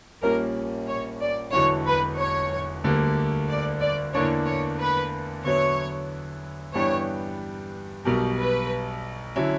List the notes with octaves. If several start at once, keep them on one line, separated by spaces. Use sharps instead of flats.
A#1 A#2 G3 A#3 C#4 A#4
C#5
D5
E1 E2 D3 F#3 C#5
B4
C#5
D2 D3 G3 A#3
D5
D5
E2 D3 A#3 D4 C#5
C#5
B4
E2 D3 F#3 B3 E4 C#5
G2 E3 B3 D4 G4 C#5
B1 B2 G3 A#4
B4
D3 F#3 C#4 E4